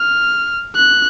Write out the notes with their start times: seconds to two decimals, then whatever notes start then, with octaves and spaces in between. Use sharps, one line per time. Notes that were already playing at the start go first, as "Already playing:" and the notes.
Already playing: F6
0.76 F#6